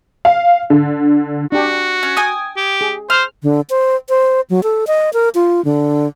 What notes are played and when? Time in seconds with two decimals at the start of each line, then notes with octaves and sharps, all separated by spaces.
0.25 F5
0.70 D3
1.52 D4 F#4 G4
2.03 C#4
2.17 G5 G#5 D#6
2.57 G4
2.81 G#4
3.10 C5 F6
3.43 D3
3.70 C5
4.09 C5
4.50 F#3
4.63 A4
4.87 D#5
5.13 A#4
5.35 F4
5.65 D3